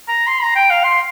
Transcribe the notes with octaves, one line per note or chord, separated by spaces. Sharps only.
A#5
C6
A#5
G5
F5
C6